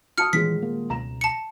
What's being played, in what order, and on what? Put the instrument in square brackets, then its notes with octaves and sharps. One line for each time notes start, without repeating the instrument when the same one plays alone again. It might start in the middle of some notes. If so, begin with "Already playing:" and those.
[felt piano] F#4 A5 D#6 [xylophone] F6 C#7
[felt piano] D#1 G#3 C#5 [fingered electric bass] E3 [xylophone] B6
[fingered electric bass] A#3
[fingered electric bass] C#2 B2 [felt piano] A#5 E7
[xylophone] A5 C#7